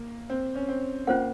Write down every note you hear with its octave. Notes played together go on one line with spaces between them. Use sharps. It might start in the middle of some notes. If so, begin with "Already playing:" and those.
Already playing: A#3
C4
C#4
C4
A#3 C#4 F4 C5 F#5